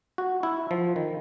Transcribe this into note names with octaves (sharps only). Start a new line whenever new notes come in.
F#4
E4
F3
D#3